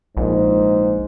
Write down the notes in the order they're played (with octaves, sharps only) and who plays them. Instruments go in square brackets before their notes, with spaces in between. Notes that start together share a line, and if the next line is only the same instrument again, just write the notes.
[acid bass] A#1 [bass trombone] G#2